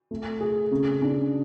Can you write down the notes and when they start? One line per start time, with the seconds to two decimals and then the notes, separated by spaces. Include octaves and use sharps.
0.11 A3
0.41 G#4
0.71 C#3
1.02 D4